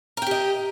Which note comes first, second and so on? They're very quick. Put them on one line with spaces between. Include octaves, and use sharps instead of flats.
A#4 G5 G4 D#5